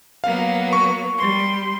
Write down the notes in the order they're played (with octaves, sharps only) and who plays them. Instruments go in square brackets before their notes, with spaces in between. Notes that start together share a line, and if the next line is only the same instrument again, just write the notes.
[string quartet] F#3 A#3 B3 [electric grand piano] F5
[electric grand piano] C#6
[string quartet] G3 C6